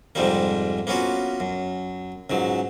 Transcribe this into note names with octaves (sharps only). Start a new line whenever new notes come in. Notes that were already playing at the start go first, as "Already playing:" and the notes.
F2 G#2 C3 F3 G3 A#3
A#3 B3 C#4 F4 F#4
F#2
C#2 G#2 F#3